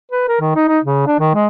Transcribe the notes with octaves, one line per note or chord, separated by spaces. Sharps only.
B4
A#4
D#3
D#4
D#4
C#3
D4
D#3
G#3